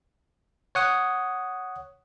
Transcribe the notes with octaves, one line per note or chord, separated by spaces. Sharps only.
C#5 F#5 D#6